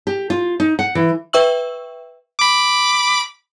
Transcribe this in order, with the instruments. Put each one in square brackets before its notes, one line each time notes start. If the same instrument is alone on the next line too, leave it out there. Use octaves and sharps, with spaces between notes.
[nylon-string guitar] G4
F4
D#4
F#5
E3
[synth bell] B4 E5 G5 C#6 E6 F#7
[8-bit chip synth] B5 D6